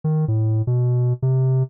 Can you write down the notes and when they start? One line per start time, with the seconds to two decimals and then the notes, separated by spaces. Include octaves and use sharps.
0.04 D#3
0.28 A2
0.67 B2
1.22 C3